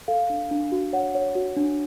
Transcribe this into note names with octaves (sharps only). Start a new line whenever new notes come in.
A4 F5
D4
D4
F#4
C#5 F#5
C#5
F#4
D4